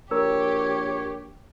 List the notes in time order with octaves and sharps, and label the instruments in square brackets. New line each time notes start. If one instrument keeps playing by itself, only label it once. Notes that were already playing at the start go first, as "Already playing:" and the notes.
[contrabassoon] A#1 [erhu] G4 [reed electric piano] A#4 E6 [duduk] C#5